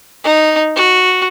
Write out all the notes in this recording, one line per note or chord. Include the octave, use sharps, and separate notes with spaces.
D#4
F#4